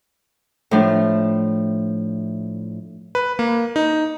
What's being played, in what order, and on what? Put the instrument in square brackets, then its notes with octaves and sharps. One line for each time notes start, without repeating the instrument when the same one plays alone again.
[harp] A2 F3 D4
[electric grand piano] B4
A#3
D#4